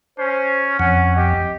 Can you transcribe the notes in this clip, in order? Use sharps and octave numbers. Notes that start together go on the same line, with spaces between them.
C#4 C5
F2 C#4 F#5
G4 D#5